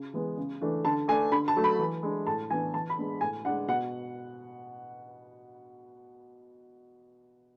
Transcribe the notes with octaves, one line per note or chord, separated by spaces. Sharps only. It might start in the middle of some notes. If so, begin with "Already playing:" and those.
Already playing: C#3
E3 G#3 B3
C#3
E3 A3 D4
D3 A5
A3 D4 G#5
D3 B5
A5
F#3 A3
B5
E3
G#3 D4
A2 A5
E3 B3 D4 G#5
E3 A5
B5
G#3 B3 D4
A2 G#5
G#3 D4 F#5
B2 F#5